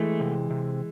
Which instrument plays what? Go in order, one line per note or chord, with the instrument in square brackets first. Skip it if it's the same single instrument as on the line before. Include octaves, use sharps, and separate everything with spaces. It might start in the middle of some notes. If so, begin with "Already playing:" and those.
Already playing: [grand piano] E3 G#3 [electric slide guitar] A3
[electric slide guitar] C3
C3